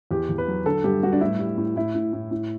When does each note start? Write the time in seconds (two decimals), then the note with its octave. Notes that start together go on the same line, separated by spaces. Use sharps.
0.11 E2 G4
0.29 E2
0.38 B4
0.48 F#3
0.66 D3 A4
0.84 G2 G4
1.03 G2 F#4
1.13 D4
1.21 A2 E4
1.39 G3
1.58 A2
1.76 A2 E4
1.95 A2
2.13 A2
2.31 A2